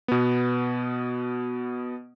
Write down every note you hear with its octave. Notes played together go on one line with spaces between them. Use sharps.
B2 B3